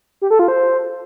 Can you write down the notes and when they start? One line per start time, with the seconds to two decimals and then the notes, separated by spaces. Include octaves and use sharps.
0.22 G4
0.30 A4
0.39 F4
0.48 C5